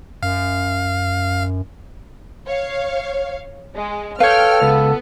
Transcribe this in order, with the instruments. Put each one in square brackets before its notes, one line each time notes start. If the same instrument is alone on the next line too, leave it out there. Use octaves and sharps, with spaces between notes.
[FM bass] F#2 [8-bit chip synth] F5
[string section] C#5 F5
G#3
[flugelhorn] A4 [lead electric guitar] B4 C#5 [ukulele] F5 [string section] G5 F6
[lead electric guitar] C#2 [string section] B3